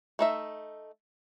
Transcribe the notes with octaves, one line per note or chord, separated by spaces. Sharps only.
A3 D#4 E5